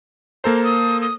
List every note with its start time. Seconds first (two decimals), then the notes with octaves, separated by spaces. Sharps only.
0.44 A#3 A4 C5 A#5
0.64 D#6
1.02 D#6